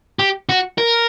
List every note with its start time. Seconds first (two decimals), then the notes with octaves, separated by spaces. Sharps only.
0.19 G4
0.49 F#4
0.78 A#4